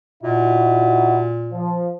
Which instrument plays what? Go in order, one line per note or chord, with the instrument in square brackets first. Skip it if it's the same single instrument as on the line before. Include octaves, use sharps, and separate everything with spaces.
[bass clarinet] A#2 [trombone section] D#4 E4 F#4
[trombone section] F3